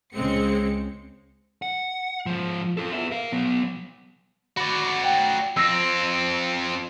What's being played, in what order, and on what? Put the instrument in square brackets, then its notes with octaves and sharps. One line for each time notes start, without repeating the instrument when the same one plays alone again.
[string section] C#2 C#3 G#3 C4 C#7
[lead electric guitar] F#5
G#2 F3
F4 A4
B3 E5
A#4 F5
F#3 B3
[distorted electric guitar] F#4 D5 [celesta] B5
[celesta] F#5 G5
[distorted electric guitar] F2 C4 [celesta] E6 A#6